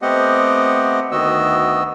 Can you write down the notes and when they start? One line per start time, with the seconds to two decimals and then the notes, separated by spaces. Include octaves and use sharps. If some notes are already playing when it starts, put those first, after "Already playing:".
0.02 A3 B3 C4 G4 D#5 F#5
1.12 D2 D#3 B3 F#4 D#5 E6